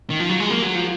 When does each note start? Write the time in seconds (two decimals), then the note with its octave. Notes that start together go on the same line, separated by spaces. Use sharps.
0.10 D#3
0.20 F3
0.29 F#3
0.40 G#3
0.50 A#3
0.62 F#3
0.75 F3